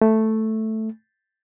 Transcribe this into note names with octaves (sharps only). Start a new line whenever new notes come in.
A3